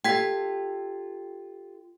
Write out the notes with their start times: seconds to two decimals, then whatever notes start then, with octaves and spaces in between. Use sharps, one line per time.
0.04 F4 G4 A4 G5 G#6 B6